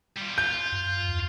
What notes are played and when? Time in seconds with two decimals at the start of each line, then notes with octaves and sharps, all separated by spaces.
0.17 G3 F4
0.38 F4 G6
0.72 F#2
1.08 E2